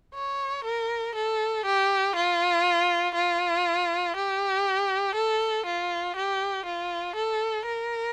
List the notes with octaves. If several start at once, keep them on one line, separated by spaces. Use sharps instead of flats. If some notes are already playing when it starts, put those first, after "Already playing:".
C#5
A#4
A4
G4
F4
F4
G4
A4
F4
G4
F4
A4
A#4